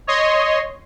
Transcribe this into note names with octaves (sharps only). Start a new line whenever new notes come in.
C#5 D#5 C6